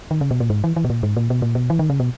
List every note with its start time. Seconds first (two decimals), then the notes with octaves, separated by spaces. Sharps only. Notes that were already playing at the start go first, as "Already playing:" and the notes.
0.11 D#3
0.21 C#3
0.31 B2
0.40 A#2
0.50 G#2
0.64 E3
0.76 E3
0.85 B2
0.90 A#2
1.03 G#2
1.17 A#2
1.30 B2
1.42 A#2
1.55 B2
1.70 E3
1.79 D#3
1.90 C#3
2.00 B2